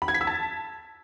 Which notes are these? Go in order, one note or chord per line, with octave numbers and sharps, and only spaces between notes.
B5
G#6
B6
E6
A5